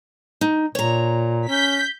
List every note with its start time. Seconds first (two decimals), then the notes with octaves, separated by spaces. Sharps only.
0.41 D#4
0.75 A#2 C#5 A#5
1.49 C#4 G6 B6